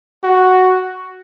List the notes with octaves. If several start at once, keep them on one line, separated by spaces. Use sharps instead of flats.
F#4